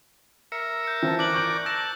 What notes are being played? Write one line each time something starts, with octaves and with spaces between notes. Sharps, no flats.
A#4 E5 C#7
G6 C#7
E3 C5 A5
A#4 D5 D6 F#6 F#7
C#6 G6 D7
A5 E6 A#6 E7